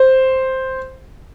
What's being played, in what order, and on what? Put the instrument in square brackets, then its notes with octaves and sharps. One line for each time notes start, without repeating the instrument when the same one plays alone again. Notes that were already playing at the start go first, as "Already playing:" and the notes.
Already playing: [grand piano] C5